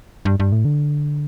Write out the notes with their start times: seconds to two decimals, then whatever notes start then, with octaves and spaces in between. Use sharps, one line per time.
0.25 G2
0.40 G2
0.52 A2
0.65 D3